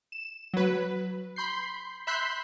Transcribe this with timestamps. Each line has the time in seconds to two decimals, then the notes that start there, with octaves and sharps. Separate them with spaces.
0.12 E7
0.54 F#3 B4
1.36 B5 C6 G6 C7
2.07 E5 B5 C6 F#6 G6 B6